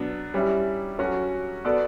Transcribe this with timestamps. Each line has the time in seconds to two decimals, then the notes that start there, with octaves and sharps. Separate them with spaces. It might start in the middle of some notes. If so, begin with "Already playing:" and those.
Already playing: B2 F#3 B3 D4
0.34 G3 C#4 E4
0.99 F#3 C#4 F#4 A4
1.65 B3 F#4 A4 D5